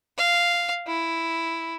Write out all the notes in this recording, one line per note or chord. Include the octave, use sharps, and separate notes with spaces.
F5
E4